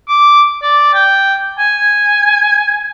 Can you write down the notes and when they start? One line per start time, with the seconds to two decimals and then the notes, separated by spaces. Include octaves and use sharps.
0.08 D6
0.62 D5
0.94 G5
1.58 G#5